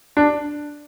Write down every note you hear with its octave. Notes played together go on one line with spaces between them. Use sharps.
D4